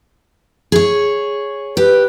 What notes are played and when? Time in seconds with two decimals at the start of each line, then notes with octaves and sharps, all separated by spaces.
0.72 G#4 C#5
1.77 G4 B4